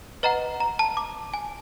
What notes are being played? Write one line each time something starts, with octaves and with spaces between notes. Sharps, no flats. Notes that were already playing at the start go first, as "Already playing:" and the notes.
B4 D#5 F#5 A#5
A#5
A5
D6
G#5